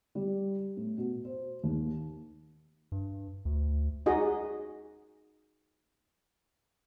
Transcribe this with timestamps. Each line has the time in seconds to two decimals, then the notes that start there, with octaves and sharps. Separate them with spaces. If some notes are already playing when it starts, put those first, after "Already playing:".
0.15 G3
0.77 A2
0.98 B2
1.25 C5
1.63 D#2
2.92 G2
3.45 D2
4.06 D#4 F#4 G#4 D#5